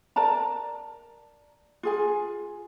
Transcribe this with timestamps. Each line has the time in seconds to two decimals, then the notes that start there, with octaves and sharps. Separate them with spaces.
0.16 A#4 D5 A5 A#5
1.83 F4 G#4 G#5